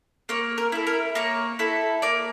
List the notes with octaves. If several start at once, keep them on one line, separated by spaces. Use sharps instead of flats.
A#3 C#5
A#4
E4 A4
A#4
A#3 C#5
E4 A4
A#3 D5